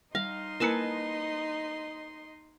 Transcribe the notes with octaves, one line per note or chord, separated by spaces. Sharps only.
G3 D#4 D#5 F5 C6
A#3 E4 A#4 B4 G#5 A5